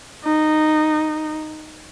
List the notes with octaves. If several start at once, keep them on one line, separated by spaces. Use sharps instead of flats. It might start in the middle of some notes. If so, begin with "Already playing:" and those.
D#4